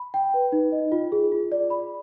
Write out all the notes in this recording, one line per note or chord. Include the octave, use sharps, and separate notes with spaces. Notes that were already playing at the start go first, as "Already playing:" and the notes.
Already playing: B5
G5
B4
D#4
D#5
F4
G#4
F4
D5
B5